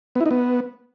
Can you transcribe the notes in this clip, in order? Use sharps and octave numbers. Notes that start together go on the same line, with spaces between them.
B3
E4
D#4
B3